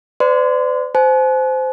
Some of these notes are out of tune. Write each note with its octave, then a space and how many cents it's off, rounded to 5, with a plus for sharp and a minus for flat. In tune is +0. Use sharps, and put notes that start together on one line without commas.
B4 +45 D5 +0 C6 -30
C5 -15 G#5 +45